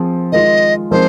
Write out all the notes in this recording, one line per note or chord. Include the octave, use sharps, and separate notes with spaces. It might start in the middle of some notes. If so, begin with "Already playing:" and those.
Already playing: F3 C4 G#4
D#3 G#3 F4 D#5
F3 G#3 C4 D#4 A#4 C5